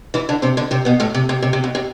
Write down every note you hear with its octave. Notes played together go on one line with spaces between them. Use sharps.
E3 E4
D3 D4
C3 C4
D3 D4
C3 C4
B2 B3
A2 A3
C3
C3
C3
C3
B2
C3